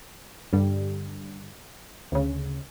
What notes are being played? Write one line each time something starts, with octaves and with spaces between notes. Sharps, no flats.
G2 D3 G3
D2 C#3